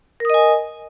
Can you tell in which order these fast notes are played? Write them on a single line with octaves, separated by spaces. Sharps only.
A#4 D#6 D#5 G#5